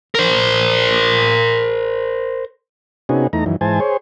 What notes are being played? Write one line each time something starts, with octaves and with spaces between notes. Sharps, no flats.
A#4 C5
C3 B3 C#4 D#4 F#4 G#4
E2 A3 D#4 A#5
F#2 D#3 E3
G#2 E3 C5 G#5 A5
G#4 C5 C#5